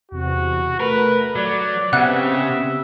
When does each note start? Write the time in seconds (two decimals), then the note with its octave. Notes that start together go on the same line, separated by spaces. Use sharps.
0.11 E2 C3 F#4
0.80 A3 A#4 B4
1.36 F#3 D5
1.93 C#3 B3 C4 G4 E5 F#5 F#6